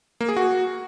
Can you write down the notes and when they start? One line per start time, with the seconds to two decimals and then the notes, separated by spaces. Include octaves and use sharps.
0.21 A#3
0.29 G#4
0.37 F#4